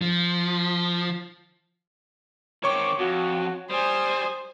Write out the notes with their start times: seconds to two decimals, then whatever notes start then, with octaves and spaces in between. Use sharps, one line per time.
0.01 F3
2.64 D#3 C4 C#5 C#6 D6
2.99 F2 F#4
3.70 G3 C5 G#5 D#6